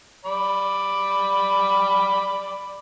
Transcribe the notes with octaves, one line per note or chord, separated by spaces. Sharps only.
D5 B5